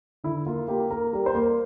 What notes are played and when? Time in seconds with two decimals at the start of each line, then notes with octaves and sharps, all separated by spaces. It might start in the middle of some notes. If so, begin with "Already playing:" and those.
0.24 D3 E4
0.46 A#3 F4
0.68 A#3 G4
0.90 A#3 A#4
1.13 G3 A#4
1.26 C5
1.35 A#3 A#4